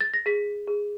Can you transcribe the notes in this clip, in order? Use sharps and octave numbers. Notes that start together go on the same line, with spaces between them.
A6
A#6
G#4 B6
G#4